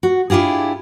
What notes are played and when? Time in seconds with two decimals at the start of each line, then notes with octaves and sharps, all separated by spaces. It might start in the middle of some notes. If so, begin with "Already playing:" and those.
0.03 F#4
0.30 D4 E4 F4 G4 G#4